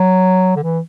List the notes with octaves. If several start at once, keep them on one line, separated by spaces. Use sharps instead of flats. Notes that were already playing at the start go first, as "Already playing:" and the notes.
Already playing: F#3
D3
E3